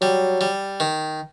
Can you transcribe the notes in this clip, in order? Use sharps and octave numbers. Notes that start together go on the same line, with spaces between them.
F#3 G3
G3
D#3